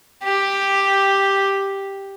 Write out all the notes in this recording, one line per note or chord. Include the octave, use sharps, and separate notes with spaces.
G4